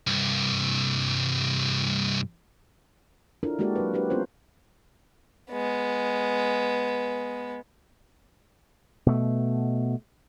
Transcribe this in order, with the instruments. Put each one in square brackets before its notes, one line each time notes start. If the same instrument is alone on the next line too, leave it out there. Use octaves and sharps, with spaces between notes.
[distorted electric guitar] C2 G2
[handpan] D4 E4 F4 A4 A#4
G#3 A#3 F#4 G4 A#4 D5
F#3 G#3 B4
C4 D4 F#4 G4 B4 C5
B3 C#4 F4 A#4 C5
[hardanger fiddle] G#3 B3
[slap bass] B2 A3